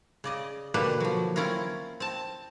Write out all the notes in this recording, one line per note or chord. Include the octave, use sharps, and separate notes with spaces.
C#3 D5 D#5
B2 D3 A#3 G4 B4
F3 F#3
C4 C#4 E4 F4 A#4
C4 A5